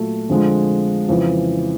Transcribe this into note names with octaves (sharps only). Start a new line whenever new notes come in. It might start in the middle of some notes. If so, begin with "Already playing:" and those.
Already playing: A#2 F#3 A3
F2 D3 F3 G#3
F2 C#3 E3